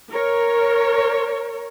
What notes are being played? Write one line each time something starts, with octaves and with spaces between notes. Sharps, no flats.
A#4 C#5